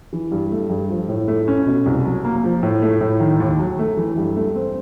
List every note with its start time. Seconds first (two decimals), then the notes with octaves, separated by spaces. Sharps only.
0.13 E3
0.32 G2
0.52 A3
0.70 G2
0.90 F3
1.09 A2
1.28 A3
1.48 C#4
1.66 B2
1.86 C2
2.05 F#3
2.25 A#3
2.44 F3
2.63 A2
2.82 A3
3.01 A2
3.20 D#3
3.40 D#2
3.59 F#3
3.79 A3
3.97 E3
4.17 G2
4.36 A3
4.55 C4